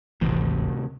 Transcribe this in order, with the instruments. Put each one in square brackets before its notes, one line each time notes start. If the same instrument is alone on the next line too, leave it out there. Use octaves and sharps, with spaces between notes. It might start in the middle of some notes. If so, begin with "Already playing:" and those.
[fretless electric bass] D1 G#1 E3 [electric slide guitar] A2 C3